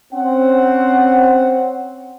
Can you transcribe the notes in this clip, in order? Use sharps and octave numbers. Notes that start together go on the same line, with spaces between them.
C4 C#4 F#5